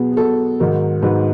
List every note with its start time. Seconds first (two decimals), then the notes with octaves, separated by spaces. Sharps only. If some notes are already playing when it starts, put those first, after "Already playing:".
Already playing: B2 F#3 B3 G#4
0.12 G#4
0.17 B2 F#3 B3 A4
0.60 G#2 D#3 F#3 A#4
1.02 G#2 D#3 F#3 B4